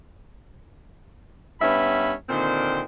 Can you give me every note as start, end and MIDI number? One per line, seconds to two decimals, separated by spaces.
1.61 2.13 43
1.61 2.13 59
1.61 2.13 61
1.61 2.13 76
1.61 2.13 83
2.29 2.82 46
2.29 2.82 50
2.29 2.82 51
2.29 2.82 60
2.29 2.82 72